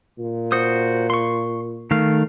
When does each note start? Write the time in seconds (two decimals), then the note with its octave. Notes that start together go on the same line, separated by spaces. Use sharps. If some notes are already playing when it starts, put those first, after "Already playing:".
0.19 A#2
0.52 F#4 C5 D#6
1.10 C6 C#6
1.91 D#3 A3 F5